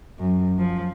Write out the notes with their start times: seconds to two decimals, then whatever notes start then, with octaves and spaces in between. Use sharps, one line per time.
0.20 F#2
0.59 F3